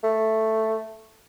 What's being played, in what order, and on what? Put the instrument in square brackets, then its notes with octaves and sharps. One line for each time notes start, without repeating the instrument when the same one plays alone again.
[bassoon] A3